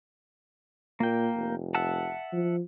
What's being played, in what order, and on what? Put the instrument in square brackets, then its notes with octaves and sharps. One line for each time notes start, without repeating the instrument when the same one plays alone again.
[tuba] A#2 [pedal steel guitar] A#3 G5
[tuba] F1
[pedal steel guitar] E5 F#5 A5
[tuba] F3